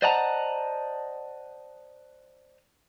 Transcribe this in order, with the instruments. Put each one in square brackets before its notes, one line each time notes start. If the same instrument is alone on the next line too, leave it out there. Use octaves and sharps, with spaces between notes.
[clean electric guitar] C5 D5 D#5 F#5 A5 A#5